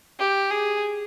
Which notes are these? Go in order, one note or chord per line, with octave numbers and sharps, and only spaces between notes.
G4
G#4